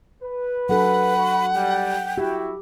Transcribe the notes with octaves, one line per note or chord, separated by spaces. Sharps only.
B4
F#3 D4 A4 F#5 B5
F#4
G3 G5
E4 F#4 G4